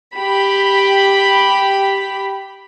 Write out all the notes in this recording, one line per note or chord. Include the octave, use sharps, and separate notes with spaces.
G4 B5